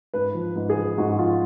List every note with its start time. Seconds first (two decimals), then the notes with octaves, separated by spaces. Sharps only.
0.14 G#2 B4
0.34 F3
0.56 G#2
0.70 G#4
0.77 F3
0.98 G#2 F#4
1.19 F3 F4